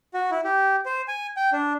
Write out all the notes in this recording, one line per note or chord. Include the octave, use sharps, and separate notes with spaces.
F#4
E4
G4
C5
G#5
G5
D4